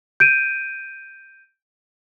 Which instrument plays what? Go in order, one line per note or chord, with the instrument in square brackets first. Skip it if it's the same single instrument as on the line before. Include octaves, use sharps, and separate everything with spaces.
[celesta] G6 D7 D#7